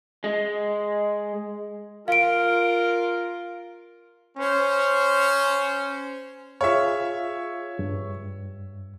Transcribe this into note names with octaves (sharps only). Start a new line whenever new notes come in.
G#3
F4 A#4 F5 D7
C#4 C5
F4 G#4 C#5 E5 F5
G2